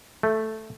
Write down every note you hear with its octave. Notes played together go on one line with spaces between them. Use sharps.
A3